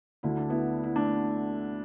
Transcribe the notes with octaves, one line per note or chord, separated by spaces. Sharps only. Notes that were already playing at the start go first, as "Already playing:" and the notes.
D2 D3 E4
D4
B3 E4
E4
A3 D4